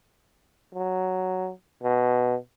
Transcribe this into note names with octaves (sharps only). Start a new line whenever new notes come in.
F#3
B2